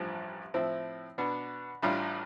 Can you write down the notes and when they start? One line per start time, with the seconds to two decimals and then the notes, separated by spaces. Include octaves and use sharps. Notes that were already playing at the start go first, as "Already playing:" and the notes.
Already playing: A1 G2 F3
0.54 A2 F3 C4 E4
1.18 B2 B3 D4
1.83 A1 A2 G3 D4 F4